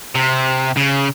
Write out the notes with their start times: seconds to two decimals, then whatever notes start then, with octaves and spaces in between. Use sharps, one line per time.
0.15 C3
0.77 C#3